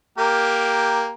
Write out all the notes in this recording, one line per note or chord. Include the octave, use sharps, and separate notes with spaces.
A#3 G4 A#4